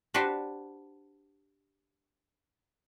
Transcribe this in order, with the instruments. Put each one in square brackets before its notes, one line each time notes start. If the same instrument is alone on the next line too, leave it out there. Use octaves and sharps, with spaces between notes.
[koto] D4 F#4 G4 B4 C5